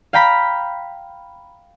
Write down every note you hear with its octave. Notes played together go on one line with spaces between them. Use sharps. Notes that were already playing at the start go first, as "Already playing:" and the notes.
F5 G5 A#5 B5 B6